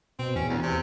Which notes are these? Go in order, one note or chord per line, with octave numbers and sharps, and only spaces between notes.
B2 C4
E2 C#4
D2
C3